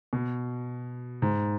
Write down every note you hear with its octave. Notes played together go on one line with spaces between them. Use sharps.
B2
G#2